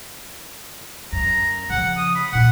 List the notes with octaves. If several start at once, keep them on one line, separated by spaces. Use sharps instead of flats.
F#2 A#5
C#3 F3 F#5
D#6
B5
A#2 E4 F#5